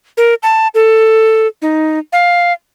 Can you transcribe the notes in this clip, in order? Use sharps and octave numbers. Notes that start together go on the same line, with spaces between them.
A#4
A5
A4
D#4
F5